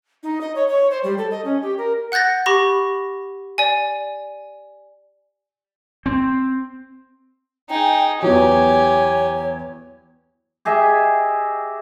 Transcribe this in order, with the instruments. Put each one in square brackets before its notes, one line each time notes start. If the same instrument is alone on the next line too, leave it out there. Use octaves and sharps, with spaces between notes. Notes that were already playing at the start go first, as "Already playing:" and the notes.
[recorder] D#4
D#5
C#5
C#5
C5
G3
A4
D#5
C#4
G4
A#4
[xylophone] F#5 F#6 G6 A6 A#6
G4 B5 C#6 A#6
D5 G#5
[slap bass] C4
[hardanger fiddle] D#4 G#4 [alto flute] G5
[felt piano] E2 E3 F#3 [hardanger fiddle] G4 G#5 [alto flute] C#5
[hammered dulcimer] G4 G#4 D#5 E5